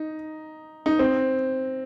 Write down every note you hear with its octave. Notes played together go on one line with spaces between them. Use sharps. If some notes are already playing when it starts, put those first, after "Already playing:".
Already playing: D#4
D#4
C4